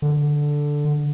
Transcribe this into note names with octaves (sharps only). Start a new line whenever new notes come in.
D3